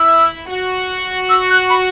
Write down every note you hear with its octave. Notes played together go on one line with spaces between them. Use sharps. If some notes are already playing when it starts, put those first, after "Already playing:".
Already playing: E4 E6
F#4
E6
F#6
B5